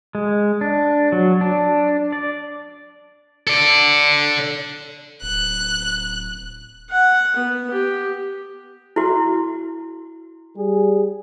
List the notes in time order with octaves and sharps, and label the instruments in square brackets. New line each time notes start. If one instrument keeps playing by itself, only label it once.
[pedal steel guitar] G#3
D4
F#3
D4
D5
[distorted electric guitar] A4 D5
[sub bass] D1 [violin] F#6
[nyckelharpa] F#5
B3
G4
[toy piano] E4 F#4
[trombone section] G3 G#4